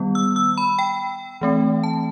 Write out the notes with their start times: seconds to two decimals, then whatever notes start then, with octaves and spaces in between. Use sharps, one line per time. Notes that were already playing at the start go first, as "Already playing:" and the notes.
Already playing: D#3 G3 B3
0.15 E6
0.36 E6
0.58 B5
0.79 G5
1.41 E3 A3 C4
1.84 A5